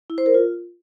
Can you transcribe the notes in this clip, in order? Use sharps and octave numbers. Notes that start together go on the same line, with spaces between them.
E4
C5
A#4
F4